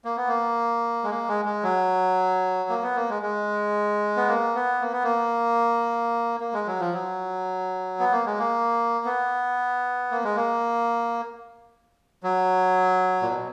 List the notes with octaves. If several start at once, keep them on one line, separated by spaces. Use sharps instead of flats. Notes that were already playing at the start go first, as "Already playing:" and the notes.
A#3
B3
A#3
G#3
A#3
G#3
G#3
F#3
A#3
B3
A#3
G#3
G#3
B3
A#3
B3
A#3
B3
A#3
A#3
G#3
F#3
F3
F#3
B3
A#3
G#3
A#3
B3
A#3
G#3
A#3
F#3
A#2
B2